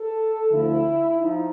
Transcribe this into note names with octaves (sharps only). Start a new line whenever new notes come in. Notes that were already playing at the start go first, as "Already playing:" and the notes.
Already playing: A4
D2 D3 F3 E4
F3 D#4